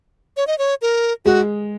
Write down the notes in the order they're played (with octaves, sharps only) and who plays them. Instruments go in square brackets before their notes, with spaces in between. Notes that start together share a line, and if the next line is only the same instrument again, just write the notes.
[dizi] C#5
D#5
C#5
A#4
[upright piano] G#3 [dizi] F#4